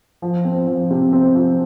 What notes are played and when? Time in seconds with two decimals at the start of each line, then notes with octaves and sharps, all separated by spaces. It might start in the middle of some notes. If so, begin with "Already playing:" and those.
0.22 F3
0.45 C4
0.67 F3
0.91 C3
1.13 C4
1.35 F3